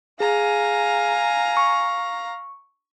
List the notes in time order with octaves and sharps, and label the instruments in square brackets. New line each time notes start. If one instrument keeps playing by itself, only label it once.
[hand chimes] G#4 [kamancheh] F5 A#5 [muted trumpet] G#5
[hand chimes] C#6